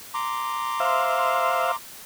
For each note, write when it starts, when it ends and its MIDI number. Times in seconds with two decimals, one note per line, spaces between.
0.14 1.76 82
0.14 1.76 84
0.14 1.76 86
0.80 1.71 72
0.80 1.71 76
0.80 1.71 77